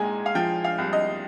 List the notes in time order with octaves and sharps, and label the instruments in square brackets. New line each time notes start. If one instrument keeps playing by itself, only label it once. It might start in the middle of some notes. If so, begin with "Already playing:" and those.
Already playing: [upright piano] A#2 G#3 G#5 A#5
F5
F3 G5
F5
C2
D#5